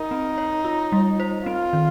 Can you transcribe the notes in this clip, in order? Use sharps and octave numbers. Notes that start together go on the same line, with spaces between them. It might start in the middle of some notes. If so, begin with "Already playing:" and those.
Already playing: D#4 A#4
C4
C#5
F4
G3
C5
C4 F4
D#3